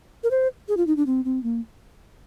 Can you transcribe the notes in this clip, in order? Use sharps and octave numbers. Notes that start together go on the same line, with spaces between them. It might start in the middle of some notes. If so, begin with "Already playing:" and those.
A#4
C5
G#4
F4
D#4
D4
C4
C4
A#3